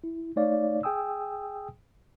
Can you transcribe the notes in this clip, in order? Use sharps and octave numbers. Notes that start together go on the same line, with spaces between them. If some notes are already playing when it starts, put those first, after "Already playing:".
E4
A3 D#4 C#5 D5 F5
G#4 G5 G#5 D#6 E6